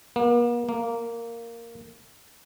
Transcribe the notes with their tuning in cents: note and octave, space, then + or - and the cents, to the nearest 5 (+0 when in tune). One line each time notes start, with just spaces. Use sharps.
A#3 +45
A#3 -5